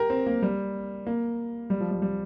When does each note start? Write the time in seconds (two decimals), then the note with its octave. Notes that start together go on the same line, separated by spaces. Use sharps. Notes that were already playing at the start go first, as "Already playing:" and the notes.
Already playing: G4 A#4
0.10 C4
0.26 A#3
0.42 G3
1.07 A#3
1.70 G3
1.80 F3
1.91 G3
2.02 G3